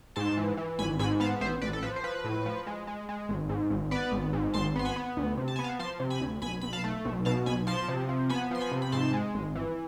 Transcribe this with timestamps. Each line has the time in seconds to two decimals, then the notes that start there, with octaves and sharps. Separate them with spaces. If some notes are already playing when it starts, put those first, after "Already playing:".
0.16 G#2 A5 C6
0.37 E3
0.57 E3
0.79 G#1 G#5 B5
0.99 G#2 G#5 B5
1.20 B3 F5 A5
1.41 A1 C5 E5
1.61 A1 B4 D5
1.73 A4
1.82 F3 B4
1.96 C5
2.04 F3 B4
2.24 A2
2.46 F3
2.67 G#3
2.87 G#3
3.09 G#3
3.29 G#1
3.49 G#2
3.70 G#1
3.91 B3 B4 D5
4.12 G#1
4.33 G#2
4.54 G#1 A5 C6
4.76 B3 C6
4.85 G#5 B5
4.96 B3
5.17 D2
5.37 C3
5.48 A5
5.56 B3 G#5
5.64 F5 A5
5.79 F3 A5 C6
6.00 C3
6.10 G#5 B5
6.21 D2
6.42 B1 G#5 B5
6.61 B1 B5
6.73 F5 A5
6.84 A3
7.05 B1
7.25 B2 F5 A5
7.46 B1 G#5 B5
7.67 F3 A5 C6
7.88 C3
8.09 F3
8.29 B3 G#5 B5
8.51 F3 C6
8.60 G#5 B5
8.72 C3
8.82 B5
8.92 G#2 A5 C6
9.13 G#3
9.34 G#1
9.55 E3